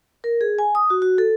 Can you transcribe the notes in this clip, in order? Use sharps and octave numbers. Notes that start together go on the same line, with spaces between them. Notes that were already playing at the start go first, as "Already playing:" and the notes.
A#4
G#4
G#5
D#6
F#4
F#4
A4